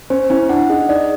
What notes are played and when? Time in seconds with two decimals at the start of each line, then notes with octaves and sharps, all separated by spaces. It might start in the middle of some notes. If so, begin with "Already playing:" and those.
0.10 C#4 C5
0.30 C#4 E4
0.49 D4 F#5
0.69 D#4 G#4
0.89 D#4 D5